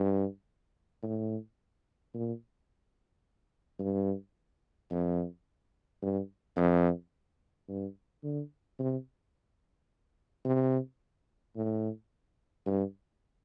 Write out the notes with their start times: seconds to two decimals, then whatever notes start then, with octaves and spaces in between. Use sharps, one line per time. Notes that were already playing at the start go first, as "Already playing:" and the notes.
Already playing: G2
1.03 A2
2.15 A#2
3.80 G2
4.91 F2
6.03 G2
6.57 F2
7.69 G2
8.24 D3
8.79 C3
10.45 C3
11.56 A2
12.66 G2